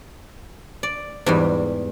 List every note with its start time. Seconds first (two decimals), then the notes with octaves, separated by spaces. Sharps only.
0.83 D5
1.26 E2 G#2 G3